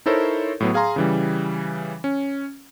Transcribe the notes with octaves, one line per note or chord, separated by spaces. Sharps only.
D#4 E4 A4 A#4 C5 C#5
A2 F#3 B3
G#4 F5 G#5 A#5 C6
C#3 E3 G3
C#4